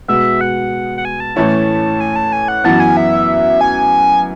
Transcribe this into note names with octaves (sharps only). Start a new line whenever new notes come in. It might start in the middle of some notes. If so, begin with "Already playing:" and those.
B2 G#3 B3 E5
F#5
F#5
G#5
A5
A2 E3 A3 C#4 E4 A5
G#5
A5
G#5
F#5
F#2 E3 B3 A5
G#5
E5
G#5